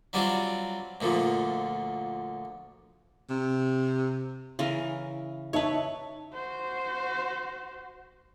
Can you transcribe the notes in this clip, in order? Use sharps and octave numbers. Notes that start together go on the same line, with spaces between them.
F#3 G3 C4 D4 F4
D2 A#2 D3 F3
C3
C#3 E3 A#4
D#4 B4 C#5 E5 A5
F#4 C5